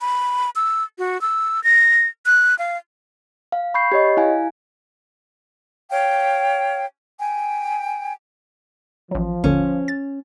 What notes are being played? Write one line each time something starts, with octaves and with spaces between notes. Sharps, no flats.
B5
E6
F#4
E6
A#6
F#6
F5
F5
B5 C#6 G6 C7
G4 C#5 D#5
E4 F5 G#5
C#5 F5 G5
G5 G#5
A1 F3 F#3
G1 D#2 D3 C#4
A6